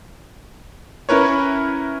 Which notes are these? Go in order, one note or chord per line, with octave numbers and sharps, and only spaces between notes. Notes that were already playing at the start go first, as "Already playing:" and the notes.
C#4 E4 A#4 B4 C#5